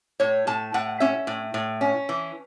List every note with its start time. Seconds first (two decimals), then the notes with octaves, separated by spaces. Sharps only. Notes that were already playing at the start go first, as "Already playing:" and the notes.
0.20 A2 C#5
0.47 A2 A5
0.74 A2 F#5
1.00 C#4 E5
1.27 A2
1.54 A2
1.81 C#4
2.09 E3